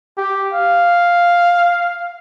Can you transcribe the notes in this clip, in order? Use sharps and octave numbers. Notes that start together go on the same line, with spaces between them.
G4
F5